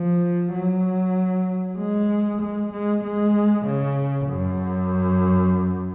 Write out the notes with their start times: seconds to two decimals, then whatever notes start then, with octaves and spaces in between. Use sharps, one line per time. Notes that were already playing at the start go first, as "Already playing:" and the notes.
Already playing: F3
0.54 F#3
1.79 G#3
2.42 G#3
2.73 G#3
3.04 G#3
3.66 C#3
4.28 F#2